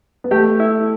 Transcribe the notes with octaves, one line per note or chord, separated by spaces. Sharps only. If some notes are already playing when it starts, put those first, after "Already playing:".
B3
A3 G4
E4